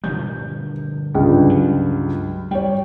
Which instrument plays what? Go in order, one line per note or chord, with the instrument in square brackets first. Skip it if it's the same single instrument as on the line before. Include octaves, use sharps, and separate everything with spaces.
[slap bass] D3 F3 G3 [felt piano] G6
[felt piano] C#2 G2
[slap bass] F#3
[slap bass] G3 [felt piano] C#5 G5